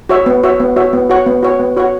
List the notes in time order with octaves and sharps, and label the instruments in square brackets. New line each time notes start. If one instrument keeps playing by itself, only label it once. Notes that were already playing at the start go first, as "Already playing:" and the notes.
[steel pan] F#4 C#5 E5
B3
F#4 C#5 E5
B3
F#4 C#5 E5
B3
F#4 C#5 F#5
B3
F#4 C#5 F#5
B3
F#4 C#5 F#5